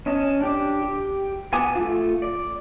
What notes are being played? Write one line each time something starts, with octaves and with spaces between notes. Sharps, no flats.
C#4 D#5 A5
D4 G4 D6
G4
B3 G#5 A5 D6 D#6
A3 F4
D5